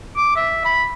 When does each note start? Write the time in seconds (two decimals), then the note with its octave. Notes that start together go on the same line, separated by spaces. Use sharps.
0.17 D6
0.36 E5
0.65 B5